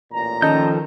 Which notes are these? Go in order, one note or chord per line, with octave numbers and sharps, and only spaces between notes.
A1 A#2 A#5
D#3 F3 C#4 A4 D#5 A5 G6